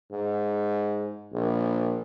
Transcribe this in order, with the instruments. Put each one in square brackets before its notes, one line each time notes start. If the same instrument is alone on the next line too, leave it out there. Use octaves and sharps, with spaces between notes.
[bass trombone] G#2
A#1